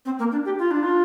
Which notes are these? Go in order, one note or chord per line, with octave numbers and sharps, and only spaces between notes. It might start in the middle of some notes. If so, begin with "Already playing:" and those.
C4
A#3
D4
G4
F4
D4
F4